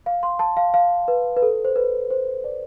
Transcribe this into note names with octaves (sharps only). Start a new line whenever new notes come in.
F5
C6
A5
F5
F5
B4
B4
A4
C5
B4
C5
D5